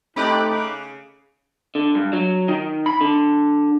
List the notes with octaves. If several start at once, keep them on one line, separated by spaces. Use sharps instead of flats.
A3 C4 D#4 G4 A4 B5 D6 F#6
C#3
D3
G2
F#3
D#3
B5
D3